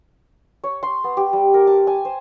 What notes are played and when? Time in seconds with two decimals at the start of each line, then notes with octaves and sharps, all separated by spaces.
0.64 C#5
0.83 C6
1.04 B3
1.17 G4
1.33 G3
1.54 A#4
1.67 A5
1.87 G#5
2.05 C5